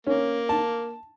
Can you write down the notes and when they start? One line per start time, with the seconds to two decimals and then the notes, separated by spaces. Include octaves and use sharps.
0.07 A#3 C#4
0.49 A5